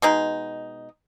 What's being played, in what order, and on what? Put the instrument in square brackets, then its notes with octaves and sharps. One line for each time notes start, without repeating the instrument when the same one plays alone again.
[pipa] B2 G#3 D#4